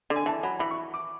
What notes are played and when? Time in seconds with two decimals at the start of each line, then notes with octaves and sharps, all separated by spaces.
0.10 D3
0.16 G#5
0.26 E3 A5
0.43 F#3 B5
0.59 E3 B5
0.71 C#6
0.94 D6